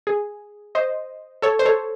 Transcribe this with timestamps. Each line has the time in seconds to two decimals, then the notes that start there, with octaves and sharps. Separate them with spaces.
0.07 G#4
0.75 C5 D#5
1.42 A4 C#5
1.59 C5
1.65 A4 C#5